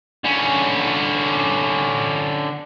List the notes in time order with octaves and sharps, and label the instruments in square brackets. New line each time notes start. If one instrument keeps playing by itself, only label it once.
[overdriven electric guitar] D3 C#4